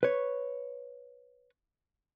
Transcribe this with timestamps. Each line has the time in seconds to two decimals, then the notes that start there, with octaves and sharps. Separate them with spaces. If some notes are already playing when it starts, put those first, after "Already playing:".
0.03 B4 C#5